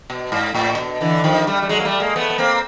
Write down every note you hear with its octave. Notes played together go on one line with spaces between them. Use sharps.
B2
G#2
A2
B2
D3 E3
D#3 F3
G3 A3
G3
F#3 G#3
A#3
G3 A3
G#3 A#3
A3 B3
B3
A#3 C4